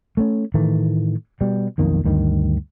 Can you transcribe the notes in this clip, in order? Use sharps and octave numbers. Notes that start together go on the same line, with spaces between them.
A3 B3 C#4
A2 D#3 E3 A3
B2 G3
B1 F2 D#3 A#3
D2 G2 D#3